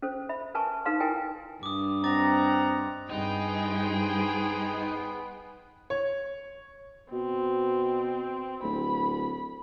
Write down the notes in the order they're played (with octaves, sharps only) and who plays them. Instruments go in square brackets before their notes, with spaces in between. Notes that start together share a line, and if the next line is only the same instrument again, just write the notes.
[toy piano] C#4 A4 C5
E5 B5
A#4 B4 G#5 A5 C#6
D#4 A4 B4 F5 C6
E4 A#4 G5 G#5
[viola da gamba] G2 [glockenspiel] D6 D#6
[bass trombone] C4 [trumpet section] D#5 F#5 A#5 [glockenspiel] D6 A6
[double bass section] G2 [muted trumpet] B3 [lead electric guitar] D#4 [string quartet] G#4 C5 G5
[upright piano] C#5
[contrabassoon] B2 [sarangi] C4
[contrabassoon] D1 [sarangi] B5